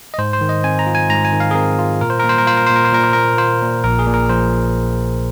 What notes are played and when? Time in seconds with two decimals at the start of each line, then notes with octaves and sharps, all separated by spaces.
0.14 D#5
0.18 G#2 C5
0.33 C5
0.41 D#3
0.49 D#5
0.64 C4 G#5
0.79 A#5
0.87 F4
0.95 G#5
1.09 G#2 A#5
1.25 G#5
1.33 D#3
1.40 F5
1.51 G#4
1.55 C4 A#4
1.79 F4
2.01 A#2 A#4
2.10 C5
2.19 A#4
2.24 A#3
2.29 C5
2.38 A#4
2.47 F4 C5
2.57 A#4
2.67 A#2 C5
2.76 A#4
2.85 C5
2.92 A#2 A#4
3.04 C5
3.13 A#3 A#4
3.38 F4 C5
3.61 A#2
3.84 A#1 A#4
3.99 G#4
4.07 A#2
4.14 A#4
4.29 F3 C5